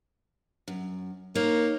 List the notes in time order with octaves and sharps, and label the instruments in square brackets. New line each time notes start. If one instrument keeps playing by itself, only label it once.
[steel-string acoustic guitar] F#2
[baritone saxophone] A#3 [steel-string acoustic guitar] D#4 C#5